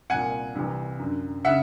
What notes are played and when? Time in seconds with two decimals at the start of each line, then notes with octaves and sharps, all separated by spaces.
0.10 C2 A#2 F#5 G#5
0.55 C2 C3 E3
0.99 F#2 D3
1.45 C#3 E5 F#5